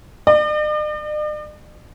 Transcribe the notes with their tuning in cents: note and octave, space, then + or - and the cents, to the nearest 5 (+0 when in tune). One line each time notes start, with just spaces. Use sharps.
D5 +45